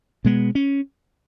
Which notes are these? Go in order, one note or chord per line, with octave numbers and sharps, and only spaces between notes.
B2 G#3 B3
C#4